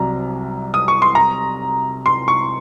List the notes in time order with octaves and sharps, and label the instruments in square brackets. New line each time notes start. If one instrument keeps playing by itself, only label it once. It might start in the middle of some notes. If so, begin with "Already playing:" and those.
Already playing: [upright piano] C2 C3 F#3 [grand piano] A#5
[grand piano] D#6
C#6
C6
A#5
C6
C#6